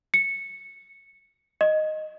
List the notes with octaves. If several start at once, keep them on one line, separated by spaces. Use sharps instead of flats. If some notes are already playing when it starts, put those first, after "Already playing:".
C#7
D#5